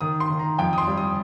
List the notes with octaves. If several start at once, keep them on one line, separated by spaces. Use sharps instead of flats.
D#3 D#6
C6
D#3
A#5
F2 G5
D#6
C6
G3
D#6